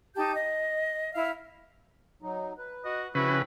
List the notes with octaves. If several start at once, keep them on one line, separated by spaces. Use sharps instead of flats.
D#4 G4 A5 G6
D#5
E4 E5 F5
F#3 D#4
B4
F#4 D#5
C#3 F3 C4 C#4 E4 F#4 B4